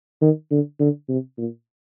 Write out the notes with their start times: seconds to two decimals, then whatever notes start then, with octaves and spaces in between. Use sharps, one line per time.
0.22 D#3
0.51 D3
0.80 D3
1.09 C3
1.38 A#2